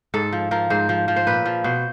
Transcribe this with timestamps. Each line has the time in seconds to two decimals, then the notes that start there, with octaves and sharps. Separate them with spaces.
0.14 G#2 A4
0.32 F3
0.51 F3 A#4
0.70 G#2 C5
0.89 F3
1.08 F3
1.16 C5
1.27 A#2 B4
1.46 F3
1.64 B2 C5